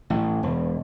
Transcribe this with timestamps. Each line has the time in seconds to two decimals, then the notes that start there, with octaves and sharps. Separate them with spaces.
0.10 A1
0.43 E1